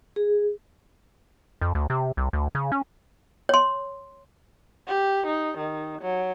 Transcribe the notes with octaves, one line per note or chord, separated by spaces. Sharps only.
G#4
F2
D2
C3
C2
D2
C#3
C#4
C#5 C6
G4
D#4
D#3
F#3